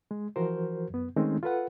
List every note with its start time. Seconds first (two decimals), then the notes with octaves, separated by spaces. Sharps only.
0.11 G#3
0.36 E3 F3 F#4 A#4 C5
0.90 F#2 B3
1.16 D#3 G#3 A3 C4 C#4 D#4
1.43 F4 A4 B4 F#5